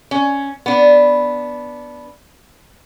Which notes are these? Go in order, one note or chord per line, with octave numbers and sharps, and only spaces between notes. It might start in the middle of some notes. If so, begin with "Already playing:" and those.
C#4
B3 D4